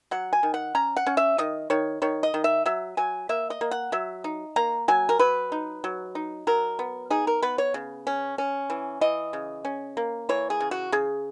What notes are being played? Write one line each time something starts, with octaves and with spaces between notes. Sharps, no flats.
F#3 F#5
G#5
D#3
F#5
C#4 A#5
F#5
C#4
E5
D#3 D#5
D#3 C#5
D#3 C#5
D#5
D#3
E5
F#3 E5
F#3 G#5
A#3 E5
D#5
A#3
F#5
F#3 E5
D#4
A#3 A#5
F#3 G#5
A#4
F#3 B4
D#4
F#3
D#4
F#3 A#4
B3
D#4 G#4
A#4
B3 B4
C#5
C#3
C#4
C#4
E3
E3 D#5
C#3
C#4
A#3
E3 C#5
G#4
C#3
F#4
C#3 G#4